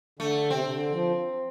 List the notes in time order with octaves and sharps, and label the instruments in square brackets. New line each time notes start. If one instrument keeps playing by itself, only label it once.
[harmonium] D3 [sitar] A3
[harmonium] C3 [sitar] C4
[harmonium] C3
D3
F3